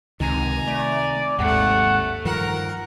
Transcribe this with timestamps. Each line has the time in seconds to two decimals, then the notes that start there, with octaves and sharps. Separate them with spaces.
0.20 C#2 C3 D#3 G#5 A#5
0.67 A3 D5
1.39 G#1 D#2 G#2 C3 A3 F#5
2.25 G2 D#3 F3 A#4 F#5